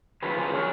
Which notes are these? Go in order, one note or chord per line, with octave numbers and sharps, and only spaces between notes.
D#3 F#3 C#4 F4 G#4 B4
G#4 B4
A#4 C#5